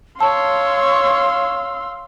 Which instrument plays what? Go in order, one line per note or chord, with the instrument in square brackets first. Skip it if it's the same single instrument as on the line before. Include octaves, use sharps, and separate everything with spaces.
[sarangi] C#5 [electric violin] F5 C6 [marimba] A5 [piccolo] E6